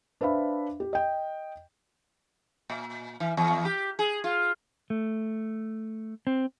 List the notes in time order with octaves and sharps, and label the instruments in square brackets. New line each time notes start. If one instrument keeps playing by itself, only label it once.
[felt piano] D4 B4 C5 E5 F5 B5
G4
D#5 G5
[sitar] A#2
E3
E2
G4
G#4
F4
[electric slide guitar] A3
C4